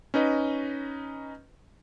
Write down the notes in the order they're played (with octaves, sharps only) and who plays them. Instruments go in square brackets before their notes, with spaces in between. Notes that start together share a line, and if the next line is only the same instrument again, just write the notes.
[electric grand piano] C#4 D#4 B4 D#5